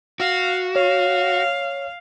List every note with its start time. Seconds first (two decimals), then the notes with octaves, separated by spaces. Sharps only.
0.20 F#4 F5
0.76 C#5 F5